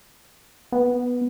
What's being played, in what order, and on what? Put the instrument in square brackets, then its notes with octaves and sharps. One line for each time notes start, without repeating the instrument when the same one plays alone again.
[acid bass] B3